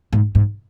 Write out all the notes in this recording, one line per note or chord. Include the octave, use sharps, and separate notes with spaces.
G#2
G#2